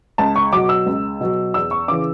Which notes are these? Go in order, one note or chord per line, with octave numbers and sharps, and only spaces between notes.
C#2 A5
C#6
B2 F#3 D6
E6
C#2
B2 F#3
E2 E6
C#6
C#3 E3 D6